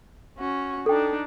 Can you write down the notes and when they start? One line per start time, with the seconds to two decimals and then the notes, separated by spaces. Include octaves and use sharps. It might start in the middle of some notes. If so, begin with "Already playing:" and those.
0.37 C#4 F#4
0.86 D4 D#4 A4 G5